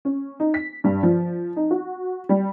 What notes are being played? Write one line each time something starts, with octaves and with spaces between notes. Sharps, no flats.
C#4
D#4
B6
G2
F3
D#4
F#4
G3